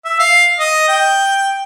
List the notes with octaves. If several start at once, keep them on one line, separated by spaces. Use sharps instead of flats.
E5
F5
D#5
G5